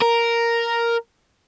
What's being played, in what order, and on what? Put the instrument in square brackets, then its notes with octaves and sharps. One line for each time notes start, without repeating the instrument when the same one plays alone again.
[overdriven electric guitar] A#4